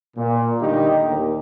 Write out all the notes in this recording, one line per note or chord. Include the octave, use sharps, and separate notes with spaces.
A#2
D3 D#3 G3 A3 D#4 G4
D#2